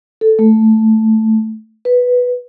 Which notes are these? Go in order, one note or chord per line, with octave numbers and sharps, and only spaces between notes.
A4
A3
B4